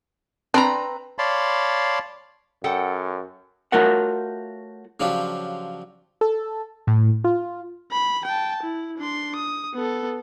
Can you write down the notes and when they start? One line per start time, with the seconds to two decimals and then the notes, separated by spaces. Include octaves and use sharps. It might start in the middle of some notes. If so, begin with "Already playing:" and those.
0.54 C4 D4 B4 A#5
1.19 C#5 D5 F5 A5 B5 C6
2.64 F#2 A4 F#5 G5
3.72 A3 F4 F#4 A#4 C#5 F#5
5.00 C#3 F3 F#3 D4 F4 G4
6.21 A4
6.87 A2
7.24 F4
7.91 B5
8.25 G5 A5
8.63 E4
8.98 D4 C6
9.36 D#6
9.74 B3 A4